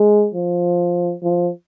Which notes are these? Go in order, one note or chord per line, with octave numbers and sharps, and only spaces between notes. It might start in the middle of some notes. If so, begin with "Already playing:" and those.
Already playing: G#3
F3
F3